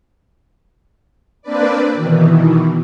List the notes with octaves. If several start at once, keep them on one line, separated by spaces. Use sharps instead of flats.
A#3 C4 D4 B4 D5
B2 D#3 E3